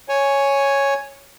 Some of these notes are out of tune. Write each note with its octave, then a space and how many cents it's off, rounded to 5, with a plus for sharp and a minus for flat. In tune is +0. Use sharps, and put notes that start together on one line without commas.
C#5 +0 G#5 +0